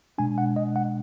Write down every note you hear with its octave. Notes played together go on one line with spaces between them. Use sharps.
B2 G#3 D4 G#5
F#5
D#5
F#5